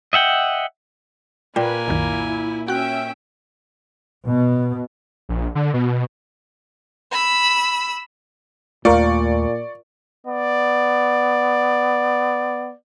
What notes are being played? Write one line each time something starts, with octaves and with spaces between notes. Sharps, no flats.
D#5 E5 F#5 G5
A#2 A#3 B4 D5 G5 G#5
C2 F#2 D#3 E4
C#4 F#4 E5 G5 F#6
B2
A#1
D3
B2
B5 E6
D#2 A#2 A3 F4 A#4 D5 C#6
B3 D5